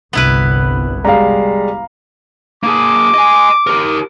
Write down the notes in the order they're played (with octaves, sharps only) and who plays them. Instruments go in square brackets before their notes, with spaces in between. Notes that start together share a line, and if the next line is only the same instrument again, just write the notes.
[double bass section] G1 C2 [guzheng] B3 E4 B4
[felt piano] G3 G#3 [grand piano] F5 A#5
[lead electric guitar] A#3 G#4 [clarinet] D6
[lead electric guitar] D#5 G#5
G4 A#4